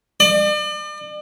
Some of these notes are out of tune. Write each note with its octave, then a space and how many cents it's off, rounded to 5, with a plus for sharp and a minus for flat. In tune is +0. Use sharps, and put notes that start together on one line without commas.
D5 +40